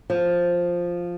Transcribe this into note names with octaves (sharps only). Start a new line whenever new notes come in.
F3